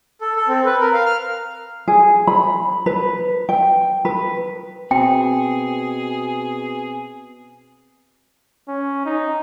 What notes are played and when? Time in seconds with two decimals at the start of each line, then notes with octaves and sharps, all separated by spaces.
0.21 A4
0.36 A4
0.48 C4
0.66 B4
0.81 A#4
0.93 F5
1.06 F6
1.88 G#4
2.27 B5
2.86 B4
3.49 G5
4.05 B4
4.91 B2 C4 G#4 G5
8.68 C#4
9.06 D#4